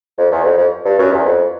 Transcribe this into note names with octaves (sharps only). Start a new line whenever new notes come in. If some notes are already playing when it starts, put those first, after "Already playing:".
F2
E2
F2
F2
G2
F#2
E2
F2